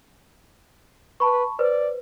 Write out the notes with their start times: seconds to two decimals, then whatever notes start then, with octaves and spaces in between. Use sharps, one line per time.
1.20 B4 A5 B5 C#6
1.59 B4 C5 D5